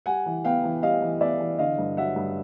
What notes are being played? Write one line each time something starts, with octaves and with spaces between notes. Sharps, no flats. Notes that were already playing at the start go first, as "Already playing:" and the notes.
G3 F#5 G#5
E3
B3 F5 G5
E3
G3 D#5 F5
E3
B3 D5 E5
E3
D3 D#5 F5
G2
F#3 E5 F#5
G2